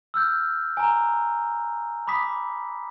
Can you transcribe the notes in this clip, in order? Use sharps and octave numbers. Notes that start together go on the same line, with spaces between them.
E6 F6 G6
G#5 A#5
B5 D6 D#6 B6